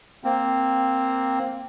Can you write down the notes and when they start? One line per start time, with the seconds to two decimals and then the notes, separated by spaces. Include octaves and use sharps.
0.24 A#3 C4